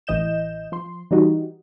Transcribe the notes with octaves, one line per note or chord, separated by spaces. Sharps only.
A1 E3 D#5 G6 E7
F3 C6
E3 G3 D#4 F#4